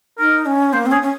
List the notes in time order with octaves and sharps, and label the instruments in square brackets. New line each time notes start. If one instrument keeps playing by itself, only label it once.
[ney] D#4 [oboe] A#4
[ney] C#4
[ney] A#3 [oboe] C5
[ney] C4
[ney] C#4 [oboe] G#4
[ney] C#4